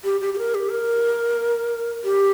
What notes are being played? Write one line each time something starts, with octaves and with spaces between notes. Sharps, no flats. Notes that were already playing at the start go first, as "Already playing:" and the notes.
G4
G4
G4
A#4
G4
A#4
G4